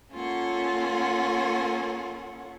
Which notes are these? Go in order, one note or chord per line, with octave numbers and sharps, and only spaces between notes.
A#3 C#4 F4 A4 C#5 F#5